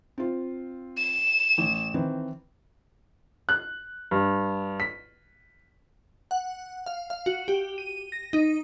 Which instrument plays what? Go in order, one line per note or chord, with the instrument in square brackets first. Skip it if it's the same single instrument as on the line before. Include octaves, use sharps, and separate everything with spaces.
[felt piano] C4 F4
[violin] E7
[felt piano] A1
D#3 E3 C4
[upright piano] F#6
G2
B6
[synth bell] F#5
F5
F5
F#4
G4
D#7
A#6
D#4